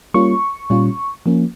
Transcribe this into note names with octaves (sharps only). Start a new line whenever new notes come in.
G3 A#3 C#4 F4 C#6
A#2 G3 C#4 F4
F3 A#3 C#4